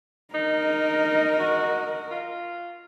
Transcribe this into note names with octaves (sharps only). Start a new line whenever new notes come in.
D#4 A#4 D#5
F#4
F4